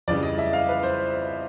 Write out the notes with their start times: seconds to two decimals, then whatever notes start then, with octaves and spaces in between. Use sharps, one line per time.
0.08 F2 C#3 E3 G3 D5
0.23 D#5
0.38 E5
0.53 F5
0.69 B4
0.83 C5